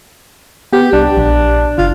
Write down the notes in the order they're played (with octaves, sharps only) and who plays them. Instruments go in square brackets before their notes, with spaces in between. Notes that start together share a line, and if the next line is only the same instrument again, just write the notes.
[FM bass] B3 [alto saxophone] G4
[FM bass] C2 [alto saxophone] D4
[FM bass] A#1
[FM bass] F#1 [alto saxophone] F4